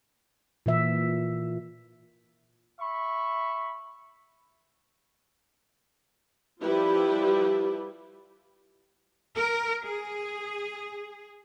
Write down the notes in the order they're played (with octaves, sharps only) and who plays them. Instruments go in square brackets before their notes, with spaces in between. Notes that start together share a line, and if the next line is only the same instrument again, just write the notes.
[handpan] A#2 E3 E5
[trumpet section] E5 B5 C#6
[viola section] F3 G3 E4 G4 B4
[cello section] A#4
G#4